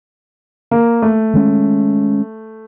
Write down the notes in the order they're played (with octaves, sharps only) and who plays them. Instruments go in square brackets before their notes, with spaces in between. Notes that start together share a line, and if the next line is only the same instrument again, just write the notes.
[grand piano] A#3
A3
[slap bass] D#3 G#3 C#4